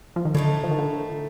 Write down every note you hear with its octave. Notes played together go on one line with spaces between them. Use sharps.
F3
D#3
A2 D3 A3 D#4
F3
D#3
D3